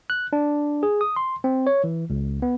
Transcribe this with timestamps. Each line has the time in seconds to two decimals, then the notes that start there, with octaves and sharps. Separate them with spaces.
0.10 F#6
0.33 D4
0.83 G#4
1.01 D#6
1.16 C6
1.44 C4
1.67 C#5
1.84 E3
2.10 C#2
2.42 B3